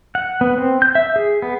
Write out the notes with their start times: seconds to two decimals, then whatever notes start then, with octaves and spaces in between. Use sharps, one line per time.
0.15 F#5
0.41 B3
0.58 C4
0.82 G6
0.95 E5
1.16 G#4
1.42 B3